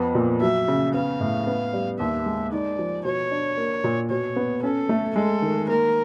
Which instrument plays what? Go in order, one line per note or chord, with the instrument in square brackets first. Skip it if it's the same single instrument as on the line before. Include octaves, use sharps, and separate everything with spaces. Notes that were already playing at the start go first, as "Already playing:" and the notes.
Already playing: [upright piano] F2 B3
A#2
[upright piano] F#3 [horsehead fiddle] E5
[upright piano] C#3
[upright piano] B3 [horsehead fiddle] F5
[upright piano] A2
B3
G3
[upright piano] D#2 [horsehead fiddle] E5
[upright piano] G#3
[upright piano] D#4 [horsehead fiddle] D5
[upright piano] F3
[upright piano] B2 [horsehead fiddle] C#5
[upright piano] D4
A#3
A#2
[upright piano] B2 [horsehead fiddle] C#5
[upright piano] B3
[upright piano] C#4 [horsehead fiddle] A4
[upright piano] A3
[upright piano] G#3 [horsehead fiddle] A4
[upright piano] D#3
[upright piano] A#3 [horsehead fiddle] A#4